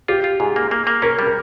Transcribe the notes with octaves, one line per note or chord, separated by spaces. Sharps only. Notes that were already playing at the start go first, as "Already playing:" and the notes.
F4 G4
F4
G#2 G#4
A#3
A#3
A#3
C#4 A#4
G3
A#4